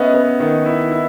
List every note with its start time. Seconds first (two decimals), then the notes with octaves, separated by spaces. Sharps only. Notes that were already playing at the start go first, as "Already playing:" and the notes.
Already playing: B3 C#4 D#5 E5 F#5
0.14 B3
0.40 D#3
0.66 E4
0.91 E4